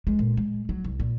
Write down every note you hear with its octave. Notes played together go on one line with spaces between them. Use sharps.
G#3
A#2
G#3
F#3
C2
A#2